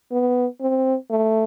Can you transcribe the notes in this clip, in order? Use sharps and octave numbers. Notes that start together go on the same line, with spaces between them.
B3
C4
A3